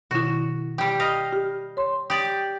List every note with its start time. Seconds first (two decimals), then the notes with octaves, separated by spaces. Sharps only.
0.11 B2 D#3 E4 F#4
0.78 G3 G4 G5
1.00 D#5 F5
1.33 G4
1.77 C#5 C6
2.10 G4 D5 D#6